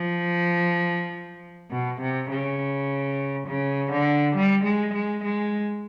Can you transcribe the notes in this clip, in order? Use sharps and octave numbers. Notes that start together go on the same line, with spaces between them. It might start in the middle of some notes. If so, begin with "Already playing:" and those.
Already playing: F3
B2
C3
C#3
C#3
D3
G3
G#3
G#3
G#3